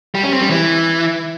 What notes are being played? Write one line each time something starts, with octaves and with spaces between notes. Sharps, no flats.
G3
C#4
C4
G3
E3